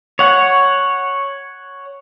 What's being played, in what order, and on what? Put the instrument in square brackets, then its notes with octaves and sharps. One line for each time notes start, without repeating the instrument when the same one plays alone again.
[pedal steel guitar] C#5 F#5